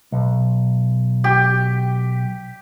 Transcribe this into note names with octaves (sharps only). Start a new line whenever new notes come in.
B1
G4